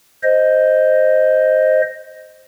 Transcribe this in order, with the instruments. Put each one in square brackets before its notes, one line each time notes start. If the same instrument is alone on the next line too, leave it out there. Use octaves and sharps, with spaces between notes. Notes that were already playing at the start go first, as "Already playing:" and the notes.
[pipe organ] C5 D#5